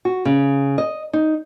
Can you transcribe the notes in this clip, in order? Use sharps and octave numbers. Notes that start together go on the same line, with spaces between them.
F#4
C#3
D#5
D#4